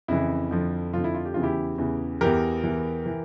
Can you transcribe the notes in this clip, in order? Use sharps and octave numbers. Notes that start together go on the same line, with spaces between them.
F2 C#3 E3 E4
F2 D3 F3
F2 D3 F3 F4
E4
F4
G4
E2 C#3 E3 F4
E4 G4
E2 C#3 E3
E2 E3 G4 A#4
E2 E3
E3